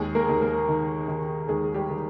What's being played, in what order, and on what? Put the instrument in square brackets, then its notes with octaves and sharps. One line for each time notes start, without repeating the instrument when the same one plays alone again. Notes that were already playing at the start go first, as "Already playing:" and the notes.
Already playing: [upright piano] D#2 G#3 G#4
A#3 A#4
D#2
A#3 A#4
D#3
D#3
D#2 G#3 G#4
G3 G4
D#3